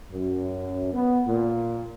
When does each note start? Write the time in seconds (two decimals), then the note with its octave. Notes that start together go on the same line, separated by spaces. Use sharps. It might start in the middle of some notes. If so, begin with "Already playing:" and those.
0.13 F#2
0.93 B3
1.27 A#2